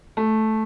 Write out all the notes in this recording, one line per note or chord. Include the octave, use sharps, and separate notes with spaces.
A3